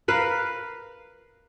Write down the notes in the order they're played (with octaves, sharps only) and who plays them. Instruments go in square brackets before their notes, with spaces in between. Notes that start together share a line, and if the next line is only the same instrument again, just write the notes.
[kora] A#4 B4 F5